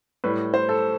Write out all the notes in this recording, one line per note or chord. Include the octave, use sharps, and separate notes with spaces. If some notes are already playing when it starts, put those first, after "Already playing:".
A2 G3 B4
C5
A4